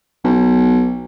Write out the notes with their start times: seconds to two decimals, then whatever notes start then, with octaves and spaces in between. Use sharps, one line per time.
0.24 B1